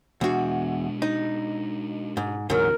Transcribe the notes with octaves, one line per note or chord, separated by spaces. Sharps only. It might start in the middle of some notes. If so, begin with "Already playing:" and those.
E2 B2 G#3 D4 F#4
D#4
G#2
D2 G#2 C3 E3 F#3 A#4